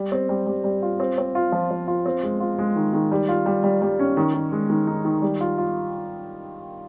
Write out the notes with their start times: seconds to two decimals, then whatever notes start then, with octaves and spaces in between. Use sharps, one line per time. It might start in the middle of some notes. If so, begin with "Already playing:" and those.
Already playing: G3
0.12 C4
0.29 G3
0.47 G3
0.64 G3
0.82 F4
1.00 C4
1.18 C4
1.35 F4
1.52 F3
1.71 F3
1.88 F4
2.06 C4
2.23 G#3
2.40 F4
2.59 G#3
2.76 D#3
2.93 D#3
3.12 G3
3.29 F4
3.46 G3
3.64 G3
3.82 G3
3.99 C#4
4.17 D#3
4.34 D#3
4.52 G#3
4.70 D#3
4.87 D#4
5.05 D#3
5.22 G3
5.41 F4
5.58 F4